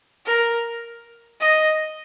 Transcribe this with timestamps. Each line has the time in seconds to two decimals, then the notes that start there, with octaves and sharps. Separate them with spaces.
0.26 A#4
1.40 D#5